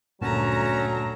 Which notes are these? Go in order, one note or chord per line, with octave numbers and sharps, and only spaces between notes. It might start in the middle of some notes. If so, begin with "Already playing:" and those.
D2 G2 A#2 F#3 C#4 F#4 A5 A#5